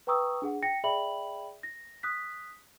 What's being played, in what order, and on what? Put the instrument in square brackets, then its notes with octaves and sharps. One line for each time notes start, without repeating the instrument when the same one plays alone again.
[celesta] B4 G5 A#5 C#6 D#6 E6
D4 G#4 F#5
G5 A#6 C#7
G#4 D5 E5 G5 B5 F#7
A#6
D#6 F#6 B6